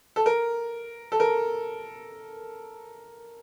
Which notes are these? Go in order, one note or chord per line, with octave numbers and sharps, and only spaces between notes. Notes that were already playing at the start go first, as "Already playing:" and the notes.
A4
A#4
A4
A#4